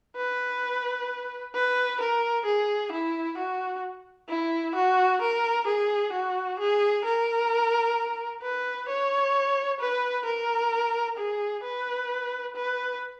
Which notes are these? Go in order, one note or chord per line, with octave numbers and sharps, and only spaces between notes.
B4
B4
A#4
G#4
E4
F#4
E4
F#4
A#4
G#4
F#4
G#4
A#4
B4
C#5
B4
A#4
G#4
B4
B4